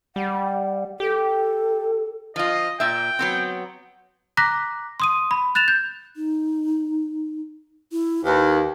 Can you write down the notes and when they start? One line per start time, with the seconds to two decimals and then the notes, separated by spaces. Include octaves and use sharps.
0.16 G3 F#5
1.00 G4 A4
2.36 F3 F4 D#5
2.80 A#2 E5 G5
3.19 F#3 B3 C4
4.37 A#5 D6 F#6 A#6 B6
5.00 C6 D#6 D#7
5.31 B5
5.55 F#6 A6 E7 F7
5.68 G6
6.17 D#4
7.92 E4
8.25 D#2 B4